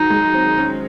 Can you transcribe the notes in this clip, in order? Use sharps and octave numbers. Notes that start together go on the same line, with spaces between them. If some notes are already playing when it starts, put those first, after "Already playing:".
Already playing: D#3 F#3 D#4
G#3
C4
C#4